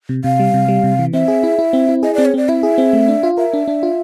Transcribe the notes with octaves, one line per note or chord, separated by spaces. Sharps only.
C3
C3 F5
G3
C3
G3
C3
E3
C4 E5
G#4
E4
E4
C4
E4
G#4 D#5
C4 D5
C#5
C4 D5
E4 E5
G#4
C4
A3
D4
F4
A#4 E5
D4
D4
F4